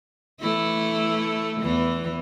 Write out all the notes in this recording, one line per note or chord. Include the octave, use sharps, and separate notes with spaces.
E3 A3 E4
E2 E3